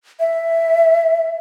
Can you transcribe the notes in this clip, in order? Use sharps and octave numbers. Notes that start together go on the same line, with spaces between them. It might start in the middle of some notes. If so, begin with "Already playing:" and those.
E5